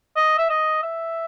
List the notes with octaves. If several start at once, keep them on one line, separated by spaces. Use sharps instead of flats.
D#5
E5
D#5
E5